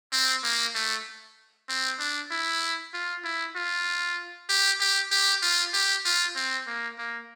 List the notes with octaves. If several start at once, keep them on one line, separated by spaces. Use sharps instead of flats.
C4
A#3
A3
C4
D4
E4
F4
E4
F4
G4
G4
G4
F4
G4
F4
C4
A#3
A#3